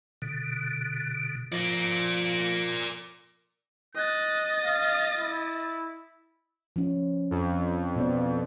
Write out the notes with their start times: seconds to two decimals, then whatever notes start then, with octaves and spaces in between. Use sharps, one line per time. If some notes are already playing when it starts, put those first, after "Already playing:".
0.22 B2 D3
1.52 F3 A#4 D5
3.95 D#5 F#6 A6
4.65 F5
5.19 E4
6.76 F3 C#4
7.31 F2
7.96 B2 B3 D5